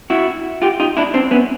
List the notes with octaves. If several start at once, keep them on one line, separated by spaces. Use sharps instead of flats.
E4 F#4
F4 G4
D#4 F4
D4 E4
C4 D4
B3 C#4